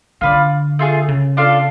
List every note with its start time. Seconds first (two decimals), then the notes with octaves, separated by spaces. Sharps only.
0.21 D3 F4 B4 D5
0.79 A3 F4 G#4
1.08 C#3
1.37 D4 F4 A4 F5